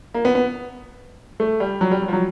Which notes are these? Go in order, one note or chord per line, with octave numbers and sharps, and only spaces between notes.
A#3
B3
B3
A3
G3
F#3
G3
F#3
F3
F#3